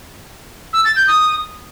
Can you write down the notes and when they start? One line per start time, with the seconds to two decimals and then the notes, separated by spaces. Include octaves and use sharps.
0.73 E6
0.85 A6
0.96 G6
1.08 D#6